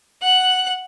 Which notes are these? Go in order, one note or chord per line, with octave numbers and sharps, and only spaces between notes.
F#5 F#6